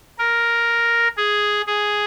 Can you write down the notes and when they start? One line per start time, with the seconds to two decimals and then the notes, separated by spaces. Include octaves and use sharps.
0.18 A#4
1.17 G#4
1.67 G#4